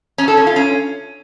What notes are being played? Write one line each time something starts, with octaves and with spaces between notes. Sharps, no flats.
C#4
A4
C#4
F4
C#4